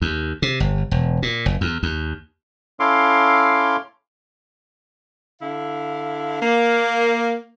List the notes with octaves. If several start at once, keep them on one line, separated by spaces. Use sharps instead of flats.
D#2
C3
G1
E1
A#2
F#1
E2
D#2
C#4 E4 A4 F5 C6 D6
D3 E4 F5
A#3